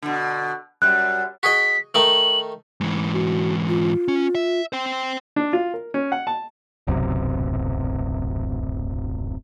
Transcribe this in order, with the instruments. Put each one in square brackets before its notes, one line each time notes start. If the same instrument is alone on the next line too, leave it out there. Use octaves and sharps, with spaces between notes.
[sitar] B2 D3
[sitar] F#2 G3 [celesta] F#6
[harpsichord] F#4 G#4 D#5 [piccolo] B6
[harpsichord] D#3 A3 D#4 [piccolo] F#7
[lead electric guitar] G#2 E3
[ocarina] F#4
F4
[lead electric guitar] C#4
E5
C5 G5
[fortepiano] D4
F4
A#4
C#4
F#5
A5
[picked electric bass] D1 B1 F#2 C3